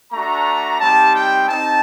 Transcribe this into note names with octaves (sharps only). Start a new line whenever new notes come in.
A3 D4 F#4 A#5
G3 C4 D#4 G4 A5
G5
C4 D#4 G4 A5